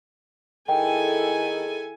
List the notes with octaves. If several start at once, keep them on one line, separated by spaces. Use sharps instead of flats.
D#3 E4 G#4 A4 G5 G#5